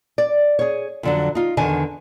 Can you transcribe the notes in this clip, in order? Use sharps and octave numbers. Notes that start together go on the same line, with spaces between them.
D5
G#4 C#5
F2 D3 F#3
D#4 F4
E2 D3 D#3 G#5